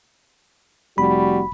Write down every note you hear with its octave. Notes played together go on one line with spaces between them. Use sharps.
F1 G3 F#4 B5